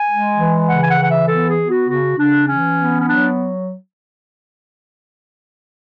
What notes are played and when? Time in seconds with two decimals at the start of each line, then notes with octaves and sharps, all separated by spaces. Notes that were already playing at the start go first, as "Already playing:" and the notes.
Already playing: G#5
0.08 G#3
0.37 E3
0.67 C#3 F#5
0.80 G#5
0.88 F#5
0.98 E3 F#5
1.08 E5
1.27 B3 A4
1.47 G#4
1.58 B3
1.68 F#4
1.87 C#3 F#4
2.17 C#3 D4
2.47 E3 C#4
2.77 B3
2.99 C#4
3.07 F#3 D4